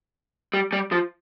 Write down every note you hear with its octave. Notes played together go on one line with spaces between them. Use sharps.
G3
G3
F3